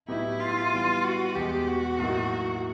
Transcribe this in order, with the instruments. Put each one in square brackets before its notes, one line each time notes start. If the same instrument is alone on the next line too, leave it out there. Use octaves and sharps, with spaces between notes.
[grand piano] A2 F#3 B3 D#4 G4 [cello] E4
[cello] F4
[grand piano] E3 G3 B3
[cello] F#4
[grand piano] E2 B2 G#3 [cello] G4
[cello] F#4
[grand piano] A2 F#3 A#3 D#4